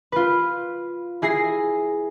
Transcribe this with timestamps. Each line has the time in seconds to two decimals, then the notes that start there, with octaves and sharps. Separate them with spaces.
0.12 F4 B4
1.22 E4 G#4 A#6 C7